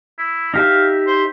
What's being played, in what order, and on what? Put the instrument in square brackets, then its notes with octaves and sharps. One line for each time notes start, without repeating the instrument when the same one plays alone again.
[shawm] E4
[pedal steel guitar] D#4 G4 E5 [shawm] F5
[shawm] C5